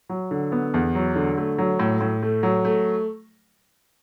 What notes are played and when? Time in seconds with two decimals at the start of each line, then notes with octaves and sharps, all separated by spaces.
0.09 F#3
0.31 D3
0.52 B3
0.74 E2
0.95 F#3
1.16 D3
1.38 A3
1.58 F#3
1.79 A2
2.01 A2
2.23 A3
2.43 F#3
2.65 A3